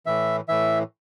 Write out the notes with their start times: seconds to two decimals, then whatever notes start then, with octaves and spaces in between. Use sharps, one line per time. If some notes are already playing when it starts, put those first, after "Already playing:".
0.06 A2 E3 E5
0.48 A2 E3 E5